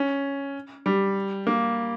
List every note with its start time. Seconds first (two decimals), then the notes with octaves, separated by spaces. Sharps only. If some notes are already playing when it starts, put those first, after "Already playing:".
Already playing: C#4
0.86 G3
1.47 A#3